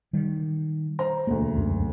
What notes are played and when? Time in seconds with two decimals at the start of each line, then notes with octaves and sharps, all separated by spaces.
0.13 D#3 G3
0.99 C5 A#5
1.27 E1 D2 A#3
1.56 C#2 F#2